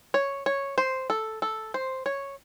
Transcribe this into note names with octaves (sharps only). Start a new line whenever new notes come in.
C#5
C#5
C5
A4
A4
C5
C#5